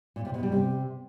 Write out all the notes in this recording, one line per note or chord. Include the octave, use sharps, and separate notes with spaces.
A#2
C3
B2
G3
C3